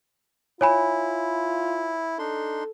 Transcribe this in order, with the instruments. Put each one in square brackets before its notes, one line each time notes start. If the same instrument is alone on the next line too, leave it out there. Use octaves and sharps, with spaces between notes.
[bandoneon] E4 [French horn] F4 [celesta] C#5 G#5 B5
[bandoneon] D4 D#4 C6 [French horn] A4